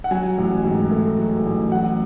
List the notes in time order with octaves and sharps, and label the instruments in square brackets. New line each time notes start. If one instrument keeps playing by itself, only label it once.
[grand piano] F#5
F#3 G#5
A1
G#2
A3
F#3
A1
F#3 F#5